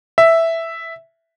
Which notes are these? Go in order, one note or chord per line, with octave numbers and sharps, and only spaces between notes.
E5